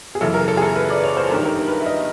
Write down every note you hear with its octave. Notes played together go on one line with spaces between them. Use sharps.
G#4
F#2 C#3 E3 A4
A#4
A4
G#4
A4
B4
D5
C#5
C5
A4
G2 D#3 A#4
A#4
A#4
B4
A#4
E5
D#5